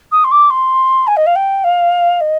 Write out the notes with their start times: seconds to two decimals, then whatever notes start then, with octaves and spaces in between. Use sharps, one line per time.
0.11 D#6
0.24 C6
0.31 D6
0.50 C6
1.07 G#5
1.16 D#5
1.26 F5
1.35 G5
1.64 F5
2.20 D#5